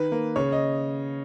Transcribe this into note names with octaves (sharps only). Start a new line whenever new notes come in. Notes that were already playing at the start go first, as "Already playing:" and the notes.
Already playing: D#3 B4
A#3
C#3 C#5
D#5